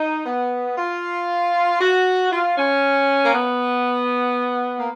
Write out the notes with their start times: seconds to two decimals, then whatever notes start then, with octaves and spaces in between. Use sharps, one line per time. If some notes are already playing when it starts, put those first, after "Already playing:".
Already playing: D#4
0.24 B3
0.77 F4
1.79 F#4
2.30 F4
2.56 C#4
3.24 A#3
3.33 B3
4.78 A#3